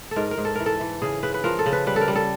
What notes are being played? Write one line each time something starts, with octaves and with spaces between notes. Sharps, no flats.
A4
G#2 A#4
A#4
G#2
A4
E3 A#4
A4
E3
C#3 G#4
C#3 B4
B4
F3 A#4
A4
C#3
B4
G3 B4
A4
A#4
G3
A4